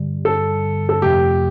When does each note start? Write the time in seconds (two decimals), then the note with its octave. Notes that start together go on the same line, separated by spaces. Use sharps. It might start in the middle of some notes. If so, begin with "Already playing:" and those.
Already playing: G2 D3 G3
0.25 A4
0.89 A4
1.02 F2 C3 F3 A3 G4